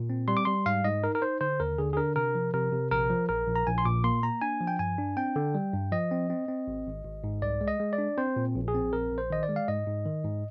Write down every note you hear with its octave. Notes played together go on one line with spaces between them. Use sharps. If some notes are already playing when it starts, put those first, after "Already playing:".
Already playing: A#2
C4
G3 C6
D6
G3 C6
G#2 F5
G#2 D#5
D#4 A#4
A#4
D#4 C5
D3 C5
D#2 A#4
D3 G#4
G#4
D4 A#4
C3 A#4
F3
C3 A#4
C3
A#1 A#4
F3
A#1 A#4
A#1
A#5
A#1 G#5
C6
A#2 D6
A#3 C6
A#3 A#5
D4 G#5
F3
G5
G2 G#5
D4
C4 G5
D3
G3
G2
F3 D#5
C4
C4
C4
G#1
G#1
G#1
G#2
C2 D5
G#3
D#5
G#3
D5
D4
C4 C5
A#2
A#1
G#4
C4
A#1 A#4
A#1
C5
D#3 D#5
D5
G#3
F5
G#2 D#5
G#2
D#3
G#2